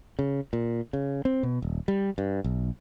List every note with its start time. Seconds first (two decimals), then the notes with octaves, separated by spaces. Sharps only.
0.19 C#3
0.53 A#2
0.93 C#3
1.25 C4
1.43 B2
1.62 D#1
1.88 G3
2.18 G2
2.44 B1